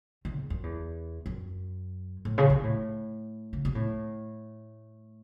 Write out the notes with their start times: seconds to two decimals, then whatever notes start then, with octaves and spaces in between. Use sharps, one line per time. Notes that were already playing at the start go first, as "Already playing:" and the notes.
0.25 D#3
0.37 G#2
0.50 F#2
0.63 E2
1.26 F#2
2.25 A2
2.38 C#3
2.50 C3
2.63 A2
3.53 C#3
3.65 C3
3.75 A2